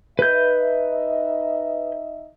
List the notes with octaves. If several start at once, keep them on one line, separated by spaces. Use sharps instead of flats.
D#4 B4 D#5 E5 G6